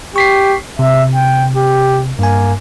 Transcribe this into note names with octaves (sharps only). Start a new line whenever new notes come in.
G4 C#6 B6 C7
C3 E5
G5
G4
G2 A#3 G#5